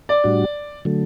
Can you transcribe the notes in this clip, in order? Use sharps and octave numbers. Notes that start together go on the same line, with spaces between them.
D5
A2 G3 D4 F#4
D3 F#3 A3